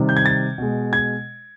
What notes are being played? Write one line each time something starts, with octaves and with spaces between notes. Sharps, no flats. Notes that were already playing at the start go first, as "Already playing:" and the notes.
Already playing: C3 D#3 G3
G6
G#6
A6
B2 G#3
G#6